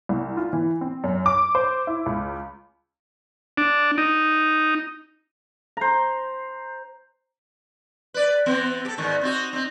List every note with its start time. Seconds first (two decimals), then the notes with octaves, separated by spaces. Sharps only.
0.09 C2
0.37 F4
0.53 E3
0.81 C4
1.04 F#2
1.26 D6
1.55 C5
1.87 E4
2.06 C#2
3.58 D4
3.98 D#4
5.77 C5 A#5
8.14 B4 D5
8.46 E3 B3 C4
8.85 G4 A4
8.98 E2 G#2 D#3
9.21 C4 D#4 F#4
9.53 C4 D#4